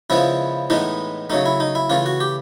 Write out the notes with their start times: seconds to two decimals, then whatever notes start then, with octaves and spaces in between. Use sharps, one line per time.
0.10 C#3 F3 G#3 B3 E4
0.70 A2 E3 G#3 B3 D#4
1.30 C#3 F#3 A3 D#4
1.46 E4
1.60 D#4
1.75 E4
1.90 C#3 E3 A3 F4
2.06 F#4
2.20 G4